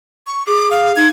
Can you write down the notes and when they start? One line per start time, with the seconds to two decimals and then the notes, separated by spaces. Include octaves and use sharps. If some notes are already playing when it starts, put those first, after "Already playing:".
0.27 C#6
0.47 G#4 D6
0.71 F5
0.96 D#4 G#6